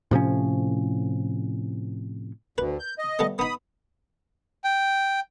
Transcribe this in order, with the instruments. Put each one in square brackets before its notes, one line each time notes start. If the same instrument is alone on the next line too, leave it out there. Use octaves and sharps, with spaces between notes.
[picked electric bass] A2 C3 F3 C#4
[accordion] D2 [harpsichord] B4
[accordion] G6
D#5
[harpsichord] G3 A3 B3
[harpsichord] B3 D#4 [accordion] B5 D#6
[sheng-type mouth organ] G5